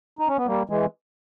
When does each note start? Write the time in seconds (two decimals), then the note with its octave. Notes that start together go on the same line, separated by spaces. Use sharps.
0.19 D#4
0.28 C#4
0.37 B3
0.46 G3 A#3
0.70 E3 G#3